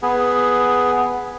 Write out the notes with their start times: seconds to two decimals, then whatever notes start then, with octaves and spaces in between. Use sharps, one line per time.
0.03 B3 G#4